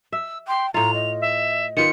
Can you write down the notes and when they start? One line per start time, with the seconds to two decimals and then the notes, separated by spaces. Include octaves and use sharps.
0.12 E5 E6
0.48 G5 C6
0.74 A2 F4 A#5 F7
0.94 D#5
1.21 E5
1.77 D#3 F4 B4 C#7